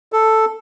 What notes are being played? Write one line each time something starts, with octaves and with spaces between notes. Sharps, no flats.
A4